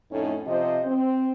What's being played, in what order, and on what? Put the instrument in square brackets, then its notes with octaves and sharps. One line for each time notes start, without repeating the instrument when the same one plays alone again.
[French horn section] F2 A2 A3 C#4 D#4
C3 F3 C5 D#5
C4